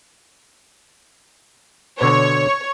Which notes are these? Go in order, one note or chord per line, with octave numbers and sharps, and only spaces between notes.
B2 D3 C#5